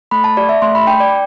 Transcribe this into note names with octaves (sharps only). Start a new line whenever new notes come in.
A3 B5
A5
G4 D5
E5
A3 C6
B5
D4 G5
D5